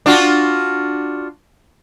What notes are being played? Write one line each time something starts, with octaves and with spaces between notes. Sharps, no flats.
D4 F4 F#4